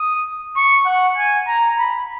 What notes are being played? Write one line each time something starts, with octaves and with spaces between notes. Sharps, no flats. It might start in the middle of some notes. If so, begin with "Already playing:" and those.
Already playing: D#6
C#6
F#5
G#5
A#5
B5